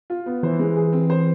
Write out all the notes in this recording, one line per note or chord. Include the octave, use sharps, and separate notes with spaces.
F4
B3
E3 C5
G#3
G#4
C4
C5